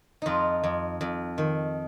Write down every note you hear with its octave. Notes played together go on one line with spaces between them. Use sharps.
F2 D#4 F4
F2
F2
D#3